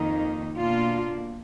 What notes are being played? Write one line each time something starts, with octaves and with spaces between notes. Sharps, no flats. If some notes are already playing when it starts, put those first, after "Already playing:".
Already playing: F2 D#3 A#3 D#4
B2 A#3 D4 F4